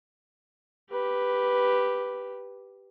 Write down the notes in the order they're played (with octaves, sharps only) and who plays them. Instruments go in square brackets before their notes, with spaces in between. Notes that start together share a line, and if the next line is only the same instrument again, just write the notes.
[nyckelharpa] G4 B4